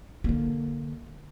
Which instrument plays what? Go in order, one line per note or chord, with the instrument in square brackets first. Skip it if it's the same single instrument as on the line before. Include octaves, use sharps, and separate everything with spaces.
[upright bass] D3 A#3